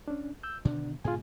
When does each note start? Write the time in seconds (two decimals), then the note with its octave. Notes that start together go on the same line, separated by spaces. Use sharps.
0.08 C#4 D4
0.43 E6 G6
0.65 B2 D3 D#3 D4
1.04 G#2 B2 D3 F4 G#4 G#5